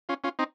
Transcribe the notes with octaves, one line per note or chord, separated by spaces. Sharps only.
C#4 F4
C#4 F4
C4 D#4